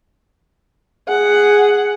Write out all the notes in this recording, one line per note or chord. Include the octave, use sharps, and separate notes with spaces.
G#4 F#5